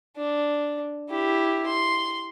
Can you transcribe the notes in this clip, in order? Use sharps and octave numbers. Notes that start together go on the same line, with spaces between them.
D4
E4 G4
C6